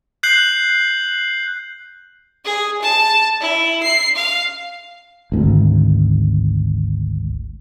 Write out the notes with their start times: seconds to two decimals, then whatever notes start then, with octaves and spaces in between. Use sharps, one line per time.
0.23 F#6 G6 C7 F#7
2.45 G#4
2.82 A5
3.41 E4
3.82 C7
4.16 F5
5.32 G#1 D2